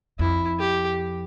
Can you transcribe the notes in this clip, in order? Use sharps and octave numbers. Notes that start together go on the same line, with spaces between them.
F2 E4
G4